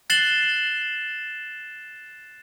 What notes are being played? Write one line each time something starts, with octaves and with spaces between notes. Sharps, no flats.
F#6 A6 C7 E7 F#7 G7